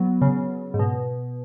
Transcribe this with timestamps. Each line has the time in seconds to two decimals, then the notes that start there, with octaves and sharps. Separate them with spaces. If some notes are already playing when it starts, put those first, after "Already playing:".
Already playing: F#3 B3
0.22 C#3
0.74 G#2
0.79 B2